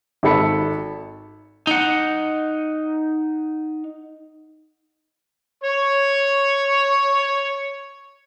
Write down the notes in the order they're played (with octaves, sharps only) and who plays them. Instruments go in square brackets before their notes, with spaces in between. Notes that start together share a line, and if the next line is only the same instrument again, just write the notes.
[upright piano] G#1 D#4 A4 B5 C#7
[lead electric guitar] D#4 F#5
[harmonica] C#5 C#6